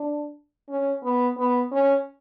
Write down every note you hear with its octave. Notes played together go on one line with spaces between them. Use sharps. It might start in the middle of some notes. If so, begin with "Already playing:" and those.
Already playing: D4
C#4
B3
B3
C#4